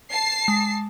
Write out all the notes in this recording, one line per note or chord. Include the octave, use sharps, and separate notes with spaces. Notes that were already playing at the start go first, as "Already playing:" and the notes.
A5 C7
G#3